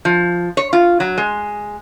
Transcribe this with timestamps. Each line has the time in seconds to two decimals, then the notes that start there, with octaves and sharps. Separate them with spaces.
0.05 F3
0.57 C#5
0.73 F4
1.00 F#3
1.18 G#3